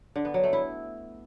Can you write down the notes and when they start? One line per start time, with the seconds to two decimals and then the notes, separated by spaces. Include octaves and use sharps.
0.16 D3
0.25 B3
0.34 F#3
0.44 A3
0.53 E4